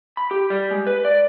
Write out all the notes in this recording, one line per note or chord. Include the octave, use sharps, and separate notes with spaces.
B5
G4
G3
G#3
B4
D5